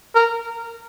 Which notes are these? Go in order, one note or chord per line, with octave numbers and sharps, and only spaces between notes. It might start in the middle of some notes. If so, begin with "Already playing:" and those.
A#4